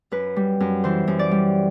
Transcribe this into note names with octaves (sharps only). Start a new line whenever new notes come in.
F#2 B4
G3
F#2
E3 C5
F#2
D5
G3